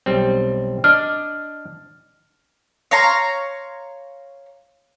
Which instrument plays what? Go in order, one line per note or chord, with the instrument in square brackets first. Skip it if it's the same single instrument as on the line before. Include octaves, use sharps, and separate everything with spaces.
[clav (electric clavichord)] B1 G3 C4
[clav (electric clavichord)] D4 D5 D#5 [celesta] F6
[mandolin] C#5 F5 A#5 C6